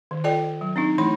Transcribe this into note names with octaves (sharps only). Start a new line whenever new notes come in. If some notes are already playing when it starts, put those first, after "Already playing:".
D#3
F4 A4 D5 D#5 G5
F#3
C4 D4 D#4
E3 A3 E4 B5